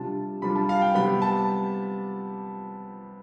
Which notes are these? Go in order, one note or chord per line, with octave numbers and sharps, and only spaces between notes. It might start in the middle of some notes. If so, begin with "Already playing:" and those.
Already playing: C3 G3 D4 F4 A5
C3 G3 D4 F4 B5
A5
F5
G5
C3 G3 B3 B5
A5